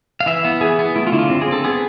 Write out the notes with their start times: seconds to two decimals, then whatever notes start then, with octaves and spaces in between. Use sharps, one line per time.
0.21 F5
0.26 E3 E5
0.45 B3
0.61 E3 G#4
0.79 B3
0.96 A3 E4
1.07 F4
1.12 D3 E4
1.19 F4
1.30 C4
1.41 G#4
1.48 C4 A4
1.64 B3 G#4